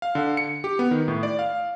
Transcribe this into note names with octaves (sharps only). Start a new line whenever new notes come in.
F5
D3
C#7
G4
B3
D#3
A2
D5
F5